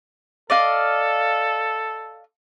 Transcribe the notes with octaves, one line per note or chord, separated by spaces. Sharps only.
A4 D5 D#5 F5